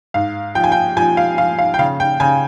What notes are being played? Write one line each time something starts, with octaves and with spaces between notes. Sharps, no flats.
G#2 F5
F3 G5
G#5
G5
F3 G#5
F5
F3 F5
F5
G5
C#3 F5
G5
C#3 G#5